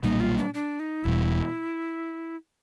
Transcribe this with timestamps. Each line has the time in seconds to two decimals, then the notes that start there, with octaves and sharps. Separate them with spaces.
0.03 B1 A#2 G3 A#3 D#4
0.20 F4
0.37 D4
0.54 D4
0.80 D#4
1.04 E1 E2 B2 G3 E4